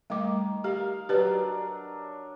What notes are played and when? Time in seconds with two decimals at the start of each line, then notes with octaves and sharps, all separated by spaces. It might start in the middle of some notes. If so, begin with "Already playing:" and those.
0.10 D#3 G3 A3 D6
0.64 G4 A#4 F5
1.09 F#3 D4 G4 B4